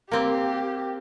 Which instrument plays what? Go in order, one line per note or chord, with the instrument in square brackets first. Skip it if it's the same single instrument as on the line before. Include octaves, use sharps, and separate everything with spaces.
[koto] A#3 C4 [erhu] G4